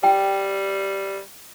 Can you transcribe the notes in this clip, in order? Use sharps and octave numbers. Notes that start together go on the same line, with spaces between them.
G3 G5